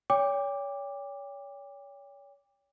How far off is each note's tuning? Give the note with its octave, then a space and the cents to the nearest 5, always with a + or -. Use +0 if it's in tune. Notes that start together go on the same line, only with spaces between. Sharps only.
C#5 +35 G5 +30 D6 +0